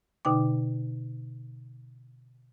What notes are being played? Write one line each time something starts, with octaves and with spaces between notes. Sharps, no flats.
B2 D3 D#4 G5 D6